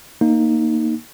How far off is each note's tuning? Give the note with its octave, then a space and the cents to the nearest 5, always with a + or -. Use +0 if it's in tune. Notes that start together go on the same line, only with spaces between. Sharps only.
A#3 +0 D#4 +0